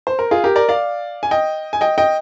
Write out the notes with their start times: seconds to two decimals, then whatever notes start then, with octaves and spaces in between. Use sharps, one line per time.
0.07 C5
0.19 A#4
0.31 F4 G#4
0.44 G4 A#4
0.56 A#4 D5
0.69 D5 F5
1.23 G#5
1.31 D#5 G5
1.73 G#5
1.81 D#5 G5
1.98 D#5 G5